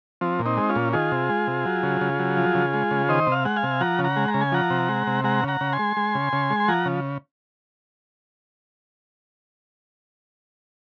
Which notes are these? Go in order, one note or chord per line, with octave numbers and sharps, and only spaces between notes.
F3 C4
A#2
C4 D#4
G#3
C#4 F4
A#2
D#3 F4 G#4
C3
G#3
C3
F#3
C#3
C#3
F#3
F3
C#3
G#3
C#3
D#3 C5 D#5
C3 F5
G#3 F#5
F5 G#5
C3
F3 F#5 A#5
C#3
F#5 A#5
G#3
A#5
C#3
G#5
F3 F#5 A#5
C3
G#3
C3
G#3 F#5 A#5
C#3
F#5 A#5
C#3
G#5 C6
G#3
G#3
C#3
C#3
G#3
C6
F3 F#5 A#5
C#3